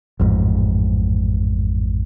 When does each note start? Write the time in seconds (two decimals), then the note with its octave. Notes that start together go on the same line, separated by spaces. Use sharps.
0.20 A1 F2 G#2